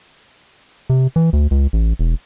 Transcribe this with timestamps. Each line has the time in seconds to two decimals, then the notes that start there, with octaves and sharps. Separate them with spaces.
0.90 C3
1.16 E3
1.33 D2
1.51 C#2
1.73 A1
1.99 E1